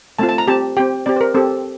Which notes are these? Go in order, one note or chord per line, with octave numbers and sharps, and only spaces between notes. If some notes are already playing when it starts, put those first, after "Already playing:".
A3 C4 F4 A5
A5
A#5
C4 G4 A5
C4 G4 G5
C4 G4 D5
C5
A#4
C4 G4 A4